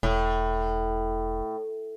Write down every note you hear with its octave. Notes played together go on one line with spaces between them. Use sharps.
E1 A2